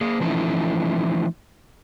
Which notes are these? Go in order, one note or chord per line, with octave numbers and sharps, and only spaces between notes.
A#3 G#4
E3 F3 A3 C#4 D#4 E4